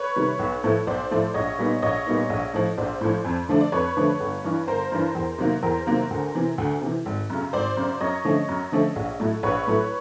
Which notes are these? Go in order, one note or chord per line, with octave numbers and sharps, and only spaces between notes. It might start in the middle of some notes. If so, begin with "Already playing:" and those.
Already playing: B4 C#5
C3 D#3 G3
B1
A2 F3 A3
B1 C5 D5
A2 F3 A3
A#1 C#5 D#5
A#2 G3 B3 D#4
A#1 C#5 D#5
A#2 G3 B3 D#4
A#1
A2 F3
A#1 C5 D5
A2 F3
F2
D3 F3 A3 D4
D5
F2 B4 C#5
D3 F3 A3 D4
G1
G2 E3
G1 A#4 C5
G2 E3
E2
C3 D#3 F#3 A#3
E2 A#4 C5
C3 D#3 F#3 A#3
D2
C3 E3
D2
C3 E3
G#1
F#2 C#3
G#1 C5 D5
F#2 C#3
F#2 C#5 D#5
D3 F3 A3 C#4
F#2
D3 F3 A3 C#4
A#1
A2 F#3 A3
A#1 B4 C#5
A2 F#3 A3